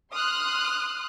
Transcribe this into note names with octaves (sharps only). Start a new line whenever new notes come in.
C6 D#6 F6 F#6